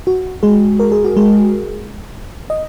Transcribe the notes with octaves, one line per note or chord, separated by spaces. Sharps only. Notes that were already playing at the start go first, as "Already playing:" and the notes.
F#4
G#3 G#4
A#4
G#4
F#4
G#3 G#4
D#5